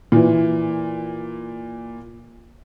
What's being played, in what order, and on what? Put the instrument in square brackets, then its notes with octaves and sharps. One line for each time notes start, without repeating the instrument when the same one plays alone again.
[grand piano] A#2 E3